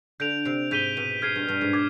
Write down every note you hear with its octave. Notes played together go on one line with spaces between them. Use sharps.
D3 G6 D7 F7
C3
G#2 G6 B6 D#7 G7
B2
G#2 F6 G#6 C7 D#7
G2
G2
G#2
B2 D6 G#6